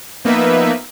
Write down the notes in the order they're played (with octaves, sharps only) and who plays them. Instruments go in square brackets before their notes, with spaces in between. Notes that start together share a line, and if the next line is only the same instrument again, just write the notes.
[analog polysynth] F3 A#3 B3 D#4 B4 E5